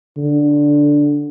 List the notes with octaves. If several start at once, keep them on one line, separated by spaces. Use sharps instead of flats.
D3